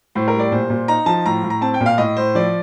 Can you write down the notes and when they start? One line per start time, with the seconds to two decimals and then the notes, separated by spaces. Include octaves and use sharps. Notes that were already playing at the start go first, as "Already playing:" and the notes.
0.15 A2 C5
0.28 A#4
0.33 G3
0.40 D5
0.52 A#2 C5
0.70 A#2
0.88 D#4 A#5
1.06 F3 A5
1.26 A2 A#5
1.44 A2
1.50 A#5
1.61 C4 A5
1.74 G5
1.80 A#2
1.86 F5
1.98 A2 D#5
2.17 A2 C5
2.35 F3 D5